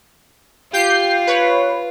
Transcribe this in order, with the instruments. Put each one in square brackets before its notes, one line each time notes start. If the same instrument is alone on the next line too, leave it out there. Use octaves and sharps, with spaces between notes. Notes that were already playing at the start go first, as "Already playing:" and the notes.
[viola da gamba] F4 [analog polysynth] G4 G6 C7
[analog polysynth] B4 C#5